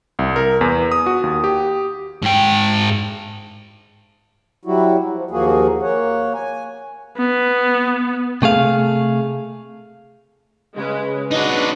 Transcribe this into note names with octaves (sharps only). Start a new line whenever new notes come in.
C2
A#4
E2
D#6
F#4
D#2
G4
G#2 G5
F#3 G3 E4 F#4
F3
D#2 F3 A#3 F#4 G#4
A#3 C#5 F#5
G#5
B3
C3 A3 G#4 F5
C#3 G#3 C#4 B4
D4 D#4 F#4 F#5